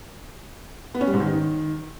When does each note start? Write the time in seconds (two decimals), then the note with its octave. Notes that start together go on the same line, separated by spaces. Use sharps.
0.94 B3
1.01 C#4
1.07 G3
1.14 G#2
1.20 D#3